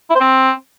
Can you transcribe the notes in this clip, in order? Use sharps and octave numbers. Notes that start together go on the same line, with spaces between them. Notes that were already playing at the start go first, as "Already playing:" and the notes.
E4
C5
C4